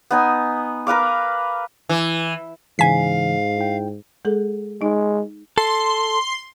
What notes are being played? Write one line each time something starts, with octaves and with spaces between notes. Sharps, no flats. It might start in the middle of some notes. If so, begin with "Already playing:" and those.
B3 D#4 G#5
A#4 B4 F5 D6
E3
G#2 C#3 E3 F5 G#5 B6
E4 G5
G#3 G#4 A4
G#3 D#4
A4 C6